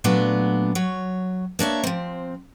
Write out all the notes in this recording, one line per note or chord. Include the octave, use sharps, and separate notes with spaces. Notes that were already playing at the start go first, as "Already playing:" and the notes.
A#2 F#3 A3 B3 D4
F#3 C#5
A#3 D4 C#5 E5
F3 C4